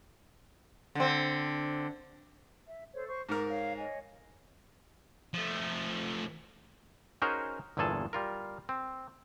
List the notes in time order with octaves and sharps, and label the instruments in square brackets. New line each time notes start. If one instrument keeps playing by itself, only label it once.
[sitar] D3 C4
[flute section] E5
A4 C5 C#5
C5 C#6
[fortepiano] G#2 A#4 [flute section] D6
[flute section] C#5 F5
C#5 D#5 G#5
[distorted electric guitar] F3 A3
[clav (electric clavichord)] C#4 D#4 F#4 G#4 A#4 C5
G1 E2 A#2 G#4 A4 A5
G3 F4 A#4
C4